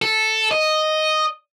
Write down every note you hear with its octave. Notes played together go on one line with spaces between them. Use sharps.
A4
D#5